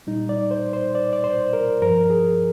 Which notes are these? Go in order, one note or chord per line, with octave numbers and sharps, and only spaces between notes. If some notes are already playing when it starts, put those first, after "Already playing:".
A#2 G3 D#4
D5
C5
C5
D5
D5
C5
A#4
G2 F3 A#4
G#4